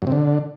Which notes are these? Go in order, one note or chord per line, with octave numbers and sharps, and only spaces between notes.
F#2
C3
D3